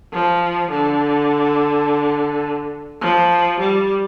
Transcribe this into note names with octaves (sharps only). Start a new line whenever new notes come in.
F3
D3
F3
G3